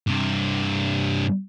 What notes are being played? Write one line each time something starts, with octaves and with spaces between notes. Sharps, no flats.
G2 C3